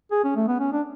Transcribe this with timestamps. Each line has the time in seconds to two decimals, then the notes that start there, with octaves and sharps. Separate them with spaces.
0.12 G#4
0.24 C#4
0.36 A3
0.48 B3
0.60 C#4
0.72 D4